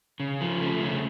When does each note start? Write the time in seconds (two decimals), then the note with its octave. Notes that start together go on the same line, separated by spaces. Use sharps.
0.20 C#3
0.41 F3
0.61 A3
0.82 C#3